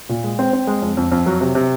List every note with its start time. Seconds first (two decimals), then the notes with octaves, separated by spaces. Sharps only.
0.09 A#2
0.24 G#3
0.39 C4
0.53 C4
0.67 G#3
0.82 F2
0.97 F2
1.11 F2
1.26 F#3
1.41 C3
1.55 C3